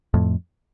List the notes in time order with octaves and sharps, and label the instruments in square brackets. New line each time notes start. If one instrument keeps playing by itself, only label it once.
[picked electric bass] F2 A2